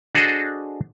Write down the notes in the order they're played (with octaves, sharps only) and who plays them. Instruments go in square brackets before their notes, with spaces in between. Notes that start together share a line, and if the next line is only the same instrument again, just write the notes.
[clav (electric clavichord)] D4 F#4 G#4 A4 C5 D#5